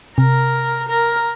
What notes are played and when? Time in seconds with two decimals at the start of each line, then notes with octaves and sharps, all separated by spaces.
0.18 C3 A#4
0.89 A#4